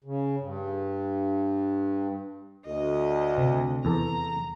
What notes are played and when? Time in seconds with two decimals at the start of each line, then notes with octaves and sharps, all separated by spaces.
0.04 C#3
0.40 G2
2.66 D2 D#5
3.38 C3
3.85 E2 A4 A#5